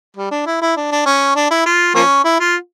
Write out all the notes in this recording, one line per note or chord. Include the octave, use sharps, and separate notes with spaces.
G3
D4
E4
E4
D4
D4
C#4
D4
E4
F4
F3 A#3 C#4
E4
F4